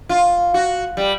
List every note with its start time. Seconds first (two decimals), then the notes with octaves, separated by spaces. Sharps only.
0.09 F4
0.54 F#4
0.97 G3